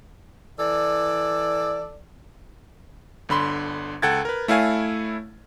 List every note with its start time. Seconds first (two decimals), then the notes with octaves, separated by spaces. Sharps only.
0.59 E3 A4 D5
3.29 G1 D3 B5 C6
4.02 C#2 A4 F#5 G5 G#6 A6
4.25 A#4 B4
4.48 A3 E4 C#5 F5 G#5